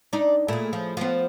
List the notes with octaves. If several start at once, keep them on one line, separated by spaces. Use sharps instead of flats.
D4 D#4 D5
A#2 A3 E4 G#4
F3
F3 B3 F4